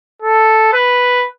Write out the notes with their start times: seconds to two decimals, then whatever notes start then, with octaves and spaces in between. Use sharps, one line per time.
0.22 A4
0.73 B4